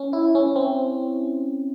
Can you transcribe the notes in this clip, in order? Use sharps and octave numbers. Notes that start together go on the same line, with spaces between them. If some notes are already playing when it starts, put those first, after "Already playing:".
Already playing: C#4
E4
C#4
C4